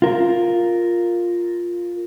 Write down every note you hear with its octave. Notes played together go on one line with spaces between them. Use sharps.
F4 A#4